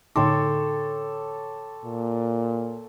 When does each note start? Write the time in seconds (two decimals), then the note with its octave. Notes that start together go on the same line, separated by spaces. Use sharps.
0.16 A2 D3 D#4 A4 C#5 G5 C6 D6
1.85 A#2